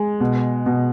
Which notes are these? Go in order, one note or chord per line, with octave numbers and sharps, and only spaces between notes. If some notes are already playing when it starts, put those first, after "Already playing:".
Already playing: G#3
B2
B2